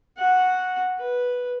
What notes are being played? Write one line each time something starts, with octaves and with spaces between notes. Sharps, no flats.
F#4 F#5
B4